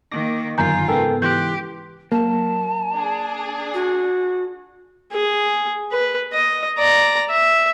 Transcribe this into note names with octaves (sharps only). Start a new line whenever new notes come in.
D#3 A#3 D6 A#6
G1 F#2 D#3 F4 G#5 A#5 G6
G#2 C#3 B3 A4 A#4 G5
E3 G4 C6 F#6 G6
F#3 A#3 A5
D4 G#4
F#4
G#4
B4
D#5
D5 A#5
E5